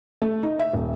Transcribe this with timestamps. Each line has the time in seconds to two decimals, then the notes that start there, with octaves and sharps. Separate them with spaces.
0.22 A3
0.43 D#4
0.59 E5
0.73 D#1